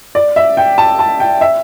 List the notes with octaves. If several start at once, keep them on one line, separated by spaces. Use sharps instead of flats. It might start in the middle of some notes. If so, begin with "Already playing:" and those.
D5
E5
G5
A5
A5
G5
E5